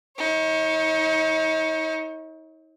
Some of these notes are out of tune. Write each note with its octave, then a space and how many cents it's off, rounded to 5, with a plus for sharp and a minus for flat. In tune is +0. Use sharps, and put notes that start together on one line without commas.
D#4 +40 C#5 -20